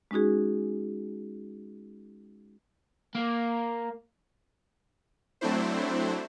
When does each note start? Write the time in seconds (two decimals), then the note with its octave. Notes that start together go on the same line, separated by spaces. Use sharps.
0.11 G#3 C#4 D#4 F#4 G#4
3.15 A#3
5.41 F#3 A3 C4 D4 E4 C5